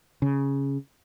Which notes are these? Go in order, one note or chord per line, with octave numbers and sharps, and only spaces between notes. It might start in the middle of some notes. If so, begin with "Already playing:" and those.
C#3